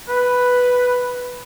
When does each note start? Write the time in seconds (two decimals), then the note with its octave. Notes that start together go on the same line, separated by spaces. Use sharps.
0.09 B4